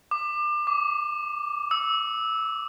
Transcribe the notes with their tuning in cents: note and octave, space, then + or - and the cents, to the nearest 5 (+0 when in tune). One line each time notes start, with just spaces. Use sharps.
D6 +30
D6 -15
E6 -15